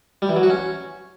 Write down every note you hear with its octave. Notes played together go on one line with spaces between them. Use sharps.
G3
E3
F#3
F#4
C#4